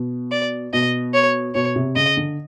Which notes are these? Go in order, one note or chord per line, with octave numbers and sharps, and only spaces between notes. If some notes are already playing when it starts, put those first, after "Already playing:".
Already playing: B2
D5
B2 D#5
C#5
B2 C#5
C3
C#3 D#5
D3